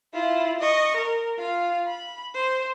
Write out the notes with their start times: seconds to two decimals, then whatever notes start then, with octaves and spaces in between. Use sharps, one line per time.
0.14 E4 F4
0.60 D#5 C#6
0.96 A#4
1.38 F4 F5
1.87 B5
2.34 C5